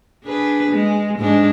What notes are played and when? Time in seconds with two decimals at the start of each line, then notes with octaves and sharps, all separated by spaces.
0.24 D4 G#4 B4
0.71 G#3
1.19 G#2 G#3 D4